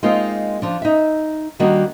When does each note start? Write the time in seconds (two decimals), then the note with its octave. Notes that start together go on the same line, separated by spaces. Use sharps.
0.03 G#3 A#3 C4 D#4 F4
0.62 F3 D4
0.82 D#4 E5
1.59 D#3 G3 A#3 D4 F#4